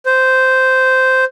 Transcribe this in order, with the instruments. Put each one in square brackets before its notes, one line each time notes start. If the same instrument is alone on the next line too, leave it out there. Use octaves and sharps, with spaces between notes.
[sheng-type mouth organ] C5